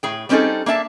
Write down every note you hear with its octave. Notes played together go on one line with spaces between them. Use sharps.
A2 G#4 G5
G3 C4 C#4 D#4 G#4 A4
A#3 D4 E5 A5